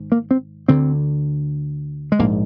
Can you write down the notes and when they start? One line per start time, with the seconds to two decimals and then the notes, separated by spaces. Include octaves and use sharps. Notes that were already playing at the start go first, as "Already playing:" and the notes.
Already playing: G#1 G#2
0.12 A#3
0.31 C4
0.68 D2 D3 C4
2.12 G#3
2.19 A#1 G#2 A#3